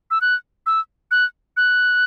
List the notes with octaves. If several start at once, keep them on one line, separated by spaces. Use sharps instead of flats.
E6
F#6
E6
F#6
F#6